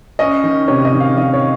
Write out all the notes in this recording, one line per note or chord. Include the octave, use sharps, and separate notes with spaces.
C#4 D#5
D#3
C3 C#5
D#5
D#3
F5
D#3 D#5
C#5